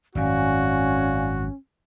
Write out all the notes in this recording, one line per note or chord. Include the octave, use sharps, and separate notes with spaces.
G#1 F#2 C#4 F#4 D5 F5 G#5